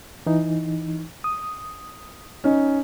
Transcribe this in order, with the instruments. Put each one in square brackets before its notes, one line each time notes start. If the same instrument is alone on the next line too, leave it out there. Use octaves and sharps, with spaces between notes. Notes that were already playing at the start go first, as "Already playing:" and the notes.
[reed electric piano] E3 D#4
D#6
[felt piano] C#4 D#4